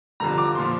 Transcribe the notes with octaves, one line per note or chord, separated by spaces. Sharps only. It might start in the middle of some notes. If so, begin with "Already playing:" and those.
F2 D3 G3 A#5
D6
A#2 F3 C6